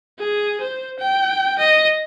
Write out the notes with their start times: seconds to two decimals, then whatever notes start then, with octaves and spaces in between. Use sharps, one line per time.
0.19 G#4
0.61 C5
0.99 G5
1.59 D#5